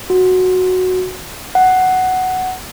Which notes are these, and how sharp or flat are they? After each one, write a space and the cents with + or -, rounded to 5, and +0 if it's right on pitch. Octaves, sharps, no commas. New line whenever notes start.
F#4 -5
F#5 +5